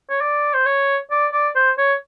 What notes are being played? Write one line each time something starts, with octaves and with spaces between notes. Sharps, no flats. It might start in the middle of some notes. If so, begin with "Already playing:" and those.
C#5
D5
C5
C#5
D5
D5
C5
C#5